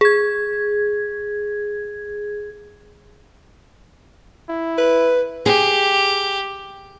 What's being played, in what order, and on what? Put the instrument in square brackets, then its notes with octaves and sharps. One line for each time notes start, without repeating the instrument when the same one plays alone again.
[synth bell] G#4 G#6
[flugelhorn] E4
[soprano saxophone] B4
[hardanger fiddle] G4 [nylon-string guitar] G#4